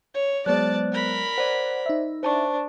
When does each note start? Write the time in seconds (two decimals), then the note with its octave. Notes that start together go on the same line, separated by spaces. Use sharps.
0.14 C#5
0.46 F#3 G#3 B3 C5 D5 A5 F#6
0.92 A#4 B5
1.38 C5 D5 F#5
1.86 D#4 E5
2.23 D4 C5 A5 C#6